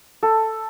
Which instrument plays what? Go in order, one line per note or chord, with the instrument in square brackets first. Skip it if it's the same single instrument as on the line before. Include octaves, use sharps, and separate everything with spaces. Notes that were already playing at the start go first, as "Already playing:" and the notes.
[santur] A4